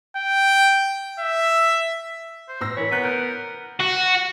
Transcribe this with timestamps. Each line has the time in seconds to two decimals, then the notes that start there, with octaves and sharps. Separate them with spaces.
0.16 G5
1.19 E5
2.48 C5
2.61 A1 E6 A#6
2.77 E3 A#4 C#5 B5
2.91 B3 A#5 F#6
3.04 A#4 G6
3.80 F#4